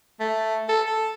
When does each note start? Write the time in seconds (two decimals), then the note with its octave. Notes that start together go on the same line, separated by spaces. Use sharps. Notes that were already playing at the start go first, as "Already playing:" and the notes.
0.20 A3
0.69 A4
0.86 A4